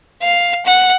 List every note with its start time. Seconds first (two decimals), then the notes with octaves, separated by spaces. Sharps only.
0.22 F5
0.66 F#5